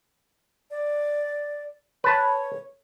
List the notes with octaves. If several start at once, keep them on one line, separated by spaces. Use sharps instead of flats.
D5
B4 C#5 A5